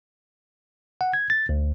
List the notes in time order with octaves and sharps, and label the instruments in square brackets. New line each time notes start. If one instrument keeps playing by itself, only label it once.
[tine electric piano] F#5
G#6
A6
D2